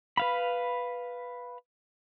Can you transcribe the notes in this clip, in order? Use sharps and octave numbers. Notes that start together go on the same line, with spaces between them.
B4 F5 B5